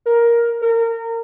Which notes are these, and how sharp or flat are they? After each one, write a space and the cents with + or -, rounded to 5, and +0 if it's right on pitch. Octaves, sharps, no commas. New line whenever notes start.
A#4 +10
A#4 -25